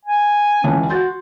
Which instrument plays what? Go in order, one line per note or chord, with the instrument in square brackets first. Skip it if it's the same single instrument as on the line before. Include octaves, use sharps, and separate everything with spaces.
[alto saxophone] G#5
[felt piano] C#2 E3 A5 [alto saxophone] C#4
[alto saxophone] F#4 [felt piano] C6 G6 A6